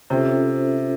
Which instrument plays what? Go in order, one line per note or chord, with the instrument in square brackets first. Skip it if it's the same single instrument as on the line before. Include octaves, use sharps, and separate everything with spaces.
[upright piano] C3 [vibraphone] C#4 F4 A4 C5 E5